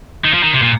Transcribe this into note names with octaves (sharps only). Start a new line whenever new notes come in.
D#3
F3
D#3
C3
A#2